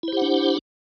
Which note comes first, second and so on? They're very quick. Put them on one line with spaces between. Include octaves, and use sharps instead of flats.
E4 C5 G4 F#5 D4